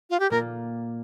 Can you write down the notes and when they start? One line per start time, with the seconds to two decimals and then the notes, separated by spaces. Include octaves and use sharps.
0.10 F4
0.20 G4
0.30 A#2 A#3 F4 A#4